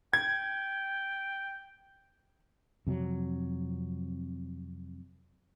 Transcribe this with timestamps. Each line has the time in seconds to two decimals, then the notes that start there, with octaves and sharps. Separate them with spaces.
0.13 G5 G#6
2.87 F2 C3 F#3